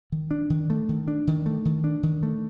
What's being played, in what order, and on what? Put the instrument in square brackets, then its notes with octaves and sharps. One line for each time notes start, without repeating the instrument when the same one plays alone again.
[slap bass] D#3
D4
D#3
A3
D#3
D4
D#3
A3
D#3
D4
D#3
A3